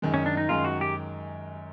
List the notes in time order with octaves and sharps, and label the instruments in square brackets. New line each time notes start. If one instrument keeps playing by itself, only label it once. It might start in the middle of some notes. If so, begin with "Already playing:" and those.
[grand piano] F#2 D#3 G#3
[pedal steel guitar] C#4
D4
D#4
[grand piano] F#2 D#3 G#3 [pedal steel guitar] F4
[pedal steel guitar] F#4
G4